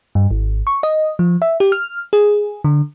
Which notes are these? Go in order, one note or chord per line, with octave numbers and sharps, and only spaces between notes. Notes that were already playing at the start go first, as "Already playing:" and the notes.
G2
G#1
C#6
D#5
F3
E5
G4
F6
G#4
D3